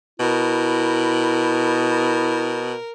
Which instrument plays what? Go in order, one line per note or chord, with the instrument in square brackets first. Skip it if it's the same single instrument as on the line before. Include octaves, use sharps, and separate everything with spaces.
[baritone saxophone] B2 [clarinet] E4 [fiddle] A#4